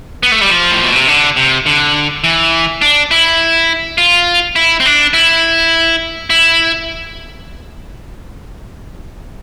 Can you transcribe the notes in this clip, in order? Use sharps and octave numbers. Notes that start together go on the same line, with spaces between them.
B3
A3
G3
F3
A2
B2
C3
D3
C3
D3
E3
D4
E4
F4
E4
C4
D4
E4
E4